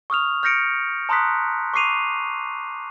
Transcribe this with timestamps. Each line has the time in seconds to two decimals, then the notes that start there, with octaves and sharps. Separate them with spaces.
0.10 C#6 D#6 F6 F7
0.43 F6 G6 A#6 C#7 D7
1.09 A5 A#5 C6 D#6 F#6 B6
1.74 C#6 D6 C7 D#7 F7